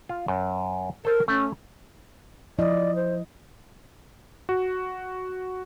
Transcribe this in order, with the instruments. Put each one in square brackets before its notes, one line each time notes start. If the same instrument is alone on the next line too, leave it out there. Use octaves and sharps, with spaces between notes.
[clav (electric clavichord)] F4
F#2
[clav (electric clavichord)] A4 C5 [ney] A#4
[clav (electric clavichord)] A3 [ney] C#4
[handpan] F3 E4 D#5 [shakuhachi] D5
[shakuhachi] C5
[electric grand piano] F#4